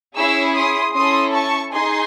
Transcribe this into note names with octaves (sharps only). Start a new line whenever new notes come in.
C#4 E4 G#4 C#6 E6
C6 D#6
C#4 E4 A4 C6 D#6
A5 C#6
D#4 G#4 G#5 C6